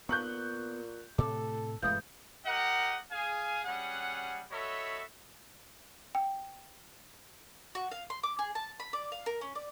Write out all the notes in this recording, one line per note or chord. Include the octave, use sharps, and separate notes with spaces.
A#2 B3 C#6 F#6 G6
A2 C3 A4 D6
E1 G2 E3 G#3 A3 F5 D#6 G6
G4 A#4 D#5 F#5
G#4 F5 G#5
G3 C#4 G#4 F#5
F#4 A4 C#5 D#5 E5 B5
G5
F#4
F5
C6
D6
G#4
A5
B5
D5
F5
A#4
C#4
D5